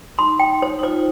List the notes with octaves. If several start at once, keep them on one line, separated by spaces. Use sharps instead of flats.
D#4 C6
G5
C5
D#4
F4 C5